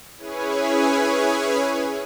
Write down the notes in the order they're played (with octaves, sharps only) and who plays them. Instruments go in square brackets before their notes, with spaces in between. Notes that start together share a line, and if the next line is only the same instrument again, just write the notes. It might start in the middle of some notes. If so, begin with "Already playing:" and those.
[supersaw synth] C#4 E4 G#4 B4 C#5 G#5